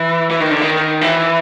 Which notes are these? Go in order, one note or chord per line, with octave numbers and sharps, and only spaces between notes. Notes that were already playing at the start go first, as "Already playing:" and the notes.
Already playing: E3
E3
D#3
D3
D#3
E3